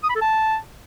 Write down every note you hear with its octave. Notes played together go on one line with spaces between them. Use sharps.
D#6
B5
A4
A5